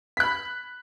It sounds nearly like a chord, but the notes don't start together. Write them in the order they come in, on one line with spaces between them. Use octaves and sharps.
B6 F#6 B5